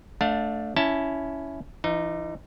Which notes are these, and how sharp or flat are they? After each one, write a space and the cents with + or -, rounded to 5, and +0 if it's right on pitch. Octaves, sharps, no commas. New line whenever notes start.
A3 +0 D4 +0 F5 +40
C#4 +15 E4 +0 A5 +5
E3 +35 D#4 -10